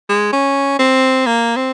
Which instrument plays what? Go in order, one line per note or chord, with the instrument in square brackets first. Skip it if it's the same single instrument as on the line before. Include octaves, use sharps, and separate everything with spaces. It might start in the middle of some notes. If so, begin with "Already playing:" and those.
[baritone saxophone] G#3
C#4
C4
A#3
C4